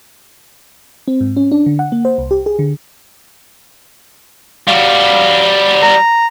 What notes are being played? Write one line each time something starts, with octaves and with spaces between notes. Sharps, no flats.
C4
G#2
C#4
D4
D3
F#5
A#3
C5
C2
G4
G#4
D3
G3 F#4 F5
A#5